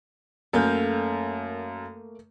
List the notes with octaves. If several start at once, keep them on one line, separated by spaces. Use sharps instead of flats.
F#2 A3 A#3 A4 A#4 F5 G6